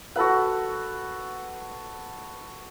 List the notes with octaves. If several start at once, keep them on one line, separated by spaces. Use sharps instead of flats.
F#4 A4 B4 F#5